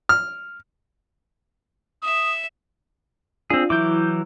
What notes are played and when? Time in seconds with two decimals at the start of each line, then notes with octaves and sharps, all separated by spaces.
0.09 F6
2.03 E5 D#6
3.50 C4 D4 F4 G#4
3.70 E3 F#3 E4 D6 G6